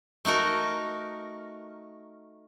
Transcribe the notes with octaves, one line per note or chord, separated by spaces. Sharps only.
A3 D#4 F#4 A#4